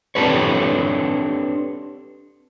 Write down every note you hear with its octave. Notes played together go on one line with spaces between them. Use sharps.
C4 D4 G4 A4 B4 C#5